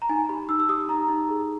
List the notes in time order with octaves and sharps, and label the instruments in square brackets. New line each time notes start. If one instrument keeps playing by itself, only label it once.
[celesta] A#5
D#4 G#5
G4 B5
D#4 E6
E6
G4 D#6
D#4 A#5
D#4
G#4